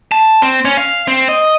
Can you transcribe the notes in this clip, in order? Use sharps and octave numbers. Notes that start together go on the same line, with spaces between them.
A5
C4
C#4
F5
C4
D#5